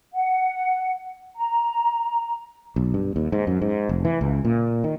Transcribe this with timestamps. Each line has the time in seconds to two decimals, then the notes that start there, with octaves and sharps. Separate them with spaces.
0.12 F#5
1.35 A#5
2.76 B1
2.94 G2
3.16 D#2
3.32 G#2
3.47 F#2
3.62 G#2
3.89 F1
4.05 E3
4.21 C#2
4.45 A#2
4.84 D#3